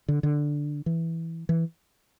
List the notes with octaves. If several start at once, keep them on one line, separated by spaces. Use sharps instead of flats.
D3
D3
E3
E3